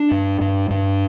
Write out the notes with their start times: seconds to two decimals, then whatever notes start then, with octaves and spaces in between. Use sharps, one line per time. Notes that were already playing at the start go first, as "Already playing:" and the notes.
Already playing: D4
0.11 G2
0.41 G2
0.70 G2